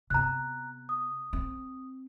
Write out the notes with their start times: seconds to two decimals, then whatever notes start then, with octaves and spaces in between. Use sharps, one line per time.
0.10 C3 B3 A#5 F#6
0.89 D#6
1.33 C4